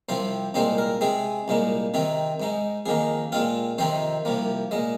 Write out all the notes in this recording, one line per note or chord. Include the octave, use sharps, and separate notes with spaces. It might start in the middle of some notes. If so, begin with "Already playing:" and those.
C2 C3 F3 C4 C5
C2 A#2 G#3 C4 D#4 C5
A#4
C3 G#3 C4 G#4
C2 A#2 G#3 D#4
C3 D#3 C4 D#4
G#2 G#3 D#4
F2 D#3 A#3 D#4 G#4
A#2 G#3 C4 F4
F2 C3 D#3 C4 D#4 C5
C2 C3 F3 A#3
A#2 G#3 D#5